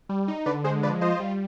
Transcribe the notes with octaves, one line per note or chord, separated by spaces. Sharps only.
G3
D#4
D3 B4 D5
G#3 G#4 C5
F3 B4 D5
F4 C5 D#5
G3